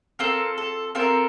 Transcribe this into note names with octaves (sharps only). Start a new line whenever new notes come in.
C4 F4 A4 A#4
A4
C4 F4 A4 A#4